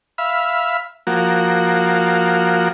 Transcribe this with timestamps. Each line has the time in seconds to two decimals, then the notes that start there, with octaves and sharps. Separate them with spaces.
0.18 E5 F5 B5
1.07 F3 A#3 F#4